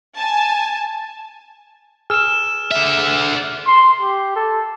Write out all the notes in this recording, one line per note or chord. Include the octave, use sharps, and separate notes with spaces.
G#5 A5
G#4 E6 F6 E7
D3 E5
C6
G4
A4